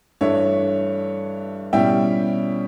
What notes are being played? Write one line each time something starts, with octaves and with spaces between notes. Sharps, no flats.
G2 E3 A3 D4 C#5 E5
B2 G3 C#4 E4 E5 G5